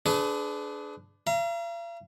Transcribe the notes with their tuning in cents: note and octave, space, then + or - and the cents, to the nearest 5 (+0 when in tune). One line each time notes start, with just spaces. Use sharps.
D4 +0 G#4 +30 B4 +40
F5 -45 A#5 +25